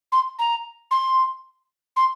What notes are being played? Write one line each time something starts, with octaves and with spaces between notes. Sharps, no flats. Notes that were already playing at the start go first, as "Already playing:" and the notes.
C6
A#5
C6
C6